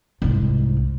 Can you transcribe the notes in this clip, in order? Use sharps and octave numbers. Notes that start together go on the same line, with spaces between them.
C2 G#2